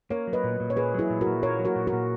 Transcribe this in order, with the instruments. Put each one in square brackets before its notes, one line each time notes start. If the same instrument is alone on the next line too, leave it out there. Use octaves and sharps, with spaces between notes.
[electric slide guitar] A#3 [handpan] A#4 C#5
[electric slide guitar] F#3
[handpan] B4 D#5
[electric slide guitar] A#2
A#2
[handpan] C#5
[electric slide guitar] A#3 [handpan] G#4 B4
[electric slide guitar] F#3 [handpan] E4 G#4
[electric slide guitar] A#2
[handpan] F#4 A#4
[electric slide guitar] A#2
[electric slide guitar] A#3 [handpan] A#4 C#5
[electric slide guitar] F#3
[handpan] F#4 A#4
[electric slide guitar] A#2
[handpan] F#4 A#4
[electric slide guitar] A#2